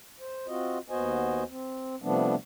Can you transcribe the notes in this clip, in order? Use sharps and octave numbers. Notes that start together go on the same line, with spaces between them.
C5
C4 F4 F#4 D#5
D#2 B3 F#4 C5 D#5 G#5
C4
C3 F3 G3 A3 B3 D4